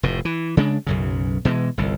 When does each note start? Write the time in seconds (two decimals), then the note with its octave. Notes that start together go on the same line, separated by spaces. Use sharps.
0.03 F1 A2
0.25 E3
0.57 C#3 G#3 D4
0.87 B1 F#2 C#3
1.45 B2 E3 F#3 G#3
1.78 G1 C2